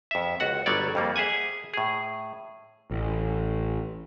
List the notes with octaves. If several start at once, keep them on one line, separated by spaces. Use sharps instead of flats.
F2 E5
C#2 F#4 F#5
G1 F#3 G3 C#5 D5
F2 G3 A#3
G#4 E5 F#5 G#5
A2 G#4
A1